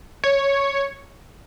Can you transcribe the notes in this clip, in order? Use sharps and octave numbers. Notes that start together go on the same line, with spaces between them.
C#5